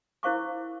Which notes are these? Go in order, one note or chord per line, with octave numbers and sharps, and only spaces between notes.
E4 A#4 C5 F5 C#6 D6